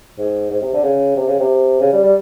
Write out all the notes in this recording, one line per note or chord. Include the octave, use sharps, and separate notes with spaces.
G#2
G#2
C3
D3
C#3
C3
C#3
C3
C#3
G3
G3